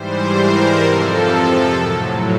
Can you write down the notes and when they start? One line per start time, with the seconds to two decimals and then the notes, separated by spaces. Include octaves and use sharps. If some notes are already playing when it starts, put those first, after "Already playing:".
Already playing: G#2 E3 G3 C5
0.37 A#4
0.82 F2 C3 F3 A4
1.74 A2 F#3